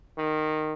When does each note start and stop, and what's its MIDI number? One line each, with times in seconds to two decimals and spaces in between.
0.18 0.74 51